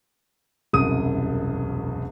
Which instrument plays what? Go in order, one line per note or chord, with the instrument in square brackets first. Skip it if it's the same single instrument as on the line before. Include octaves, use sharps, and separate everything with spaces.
[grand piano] E1 C2 F#2 D#6 D#7